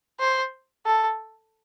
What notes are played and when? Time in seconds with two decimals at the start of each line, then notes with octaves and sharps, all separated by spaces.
0.20 C5
0.86 A4